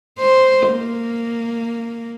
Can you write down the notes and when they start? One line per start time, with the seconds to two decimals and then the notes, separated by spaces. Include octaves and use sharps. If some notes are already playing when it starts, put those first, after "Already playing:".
0.19 C5
0.71 A#3